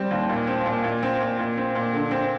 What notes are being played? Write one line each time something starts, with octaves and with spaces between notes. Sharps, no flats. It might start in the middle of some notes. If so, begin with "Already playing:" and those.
Already playing: G3 C4
D#2
A#2
C4
A#2
A#2
C4
A#2
A#2
C4
A#2
D3
C4